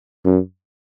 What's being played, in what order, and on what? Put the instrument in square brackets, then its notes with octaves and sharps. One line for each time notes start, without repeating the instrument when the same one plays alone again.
[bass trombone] F#2